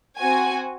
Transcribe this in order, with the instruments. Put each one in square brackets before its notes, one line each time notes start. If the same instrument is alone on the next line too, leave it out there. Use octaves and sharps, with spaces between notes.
[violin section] C4 F#4 G#5